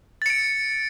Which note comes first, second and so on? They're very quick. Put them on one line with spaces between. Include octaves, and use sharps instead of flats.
A6 C#7 D7